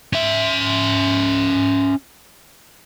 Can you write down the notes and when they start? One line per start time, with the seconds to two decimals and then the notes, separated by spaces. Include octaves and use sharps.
0.13 C#4 E5